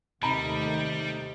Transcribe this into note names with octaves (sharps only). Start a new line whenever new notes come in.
D#2 C3 D#3 G3 A3 D#4 A#5 B5